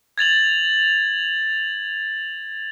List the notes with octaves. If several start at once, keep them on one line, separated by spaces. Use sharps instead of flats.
G#6 A6 F7 F#7